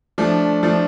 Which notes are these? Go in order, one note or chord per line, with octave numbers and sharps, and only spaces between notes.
F3 A3 D4
F3 A3 D4